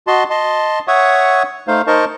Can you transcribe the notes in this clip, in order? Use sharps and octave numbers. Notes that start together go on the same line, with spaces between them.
F#4 D#5 A5 C6
D#5 A5 C6
C#5 E5 F#5 C#6 D#6
A3 D#4 C5 F5
D#4 A#4 C5 D#5 A5 C#6